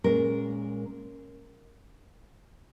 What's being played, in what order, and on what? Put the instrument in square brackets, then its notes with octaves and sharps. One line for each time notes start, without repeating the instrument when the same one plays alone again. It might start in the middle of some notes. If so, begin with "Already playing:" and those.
[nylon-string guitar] A#2 G#3 C#4 A#4